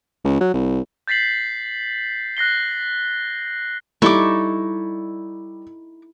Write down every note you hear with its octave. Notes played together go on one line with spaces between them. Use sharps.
C#2
F#3
C2
G6 A6 B6 C7 F#7
F#6 A#6 C7 G7
G3 D#4 E4 A4 C#6 D6